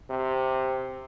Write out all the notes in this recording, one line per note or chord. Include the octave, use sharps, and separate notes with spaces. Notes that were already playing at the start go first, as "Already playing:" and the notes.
C3